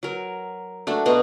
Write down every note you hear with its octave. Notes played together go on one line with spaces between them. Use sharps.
F#3 A#4
A3 D4 F#4
B2 B3 A#5 C6